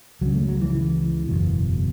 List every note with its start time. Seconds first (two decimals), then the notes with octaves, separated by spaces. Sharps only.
0.21 C#2 C#3 F#3
0.35 A3
0.48 F#3
0.61 E3
0.75 E3
1.28 F#1 E2 B2